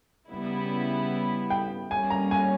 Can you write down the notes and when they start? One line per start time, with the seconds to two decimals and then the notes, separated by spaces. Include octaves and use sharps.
0.29 C#3 G3 B3 E4
1.50 G5
1.90 G3 A#3 C#4 G#5
2.10 A#5
2.31 G#5